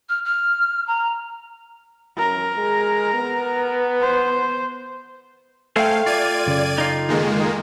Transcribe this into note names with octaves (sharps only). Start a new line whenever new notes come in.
F6
F6
A#5
F#2 A#4
G#3
B3
C5
A3 A4 C5 E5 F5 G5 G#5
F4 D5 G#6 D#7
F#2 C#3
D#4 F4
D#3 G#3 A#3